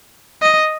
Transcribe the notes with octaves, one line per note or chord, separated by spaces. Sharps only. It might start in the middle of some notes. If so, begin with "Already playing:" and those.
D#5